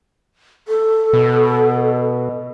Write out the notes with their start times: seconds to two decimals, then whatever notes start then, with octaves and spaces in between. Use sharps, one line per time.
0.68 A4
1.13 B2